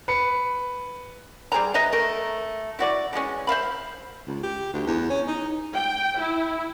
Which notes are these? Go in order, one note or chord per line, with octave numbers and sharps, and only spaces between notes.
B4 C#7
G3 G#4 C5 A#5
B4 D#5 E5 A#5
A3 A#4
E4 F#4 D5
D3 E3 G#3 C#4
C5 E5 F5 B5
C#2
G4
D2
E2
C#4
D#4
G5
E4